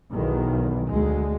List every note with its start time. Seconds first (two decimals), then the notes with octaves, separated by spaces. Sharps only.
0.11 B1 E2 D#3
0.88 D2 G#3